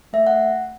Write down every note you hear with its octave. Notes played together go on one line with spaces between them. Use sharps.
A3 E5
F#5